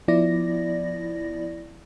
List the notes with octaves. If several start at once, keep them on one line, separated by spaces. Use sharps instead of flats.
F3 B3 E4 D5 A#6